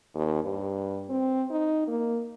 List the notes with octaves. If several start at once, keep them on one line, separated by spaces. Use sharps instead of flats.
D#2
G2
C4
D#4
A#3